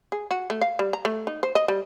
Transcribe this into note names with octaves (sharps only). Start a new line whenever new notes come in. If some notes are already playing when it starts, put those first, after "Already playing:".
G#4
F#4
A3
F5
G3
A#5
A3
D#4
C5
D#5
G3